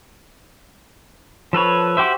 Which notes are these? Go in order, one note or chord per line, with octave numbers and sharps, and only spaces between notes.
F3 A4 B4 C#5
F#4 G4 C5 E5